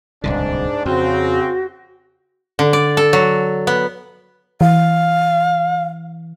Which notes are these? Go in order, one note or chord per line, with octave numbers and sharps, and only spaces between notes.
D1 C2 G#2 C#3 D4
F2 C#3 C4 F#4
D3
D5
A4
F#3
B3
E3 F5